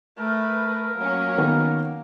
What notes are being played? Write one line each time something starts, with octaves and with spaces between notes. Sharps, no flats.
A3 A#4 B4
F#3 A#3 C#4
D#3 B3